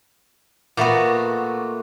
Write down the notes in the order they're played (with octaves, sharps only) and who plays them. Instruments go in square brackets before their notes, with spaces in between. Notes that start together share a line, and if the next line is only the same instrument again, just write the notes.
[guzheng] A#2 A3 B3 F#4